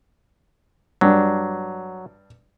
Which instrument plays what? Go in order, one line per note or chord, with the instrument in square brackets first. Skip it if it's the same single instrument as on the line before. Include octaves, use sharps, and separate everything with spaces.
[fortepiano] G2 D4 [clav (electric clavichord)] F#3